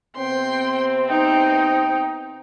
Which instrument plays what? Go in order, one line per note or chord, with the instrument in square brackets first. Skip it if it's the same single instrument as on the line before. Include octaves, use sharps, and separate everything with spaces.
[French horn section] C3 B3 C4 [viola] G5 C6
[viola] D#4 [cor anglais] G5